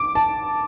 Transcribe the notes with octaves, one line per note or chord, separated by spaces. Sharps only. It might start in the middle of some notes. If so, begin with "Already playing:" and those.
Already playing: D6
A5